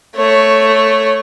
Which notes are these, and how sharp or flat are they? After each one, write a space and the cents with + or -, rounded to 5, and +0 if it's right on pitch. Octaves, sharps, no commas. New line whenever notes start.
A3 +0 C#5 +0